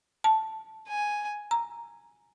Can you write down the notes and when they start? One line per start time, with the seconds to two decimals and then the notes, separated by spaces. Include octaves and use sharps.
0.24 A5
0.89 G#5
1.51 A#5